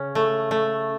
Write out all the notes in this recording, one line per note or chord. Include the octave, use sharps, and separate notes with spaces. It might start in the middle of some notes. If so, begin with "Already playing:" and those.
Already playing: C#3 C#4
A3
A3